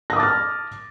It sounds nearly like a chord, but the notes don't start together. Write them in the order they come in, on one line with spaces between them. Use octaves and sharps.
A#6 D#6 D6 A6 F6